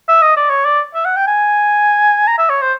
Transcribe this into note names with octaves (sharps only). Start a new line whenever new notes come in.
E5
D#5
D5
C#5
D5
E5
F#5
G5
G#5
A#5
E5
C#5
C5